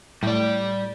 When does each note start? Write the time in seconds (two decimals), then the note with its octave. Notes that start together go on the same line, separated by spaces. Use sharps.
0.23 A2 G3 D5